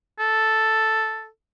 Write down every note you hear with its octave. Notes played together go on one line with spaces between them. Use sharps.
A4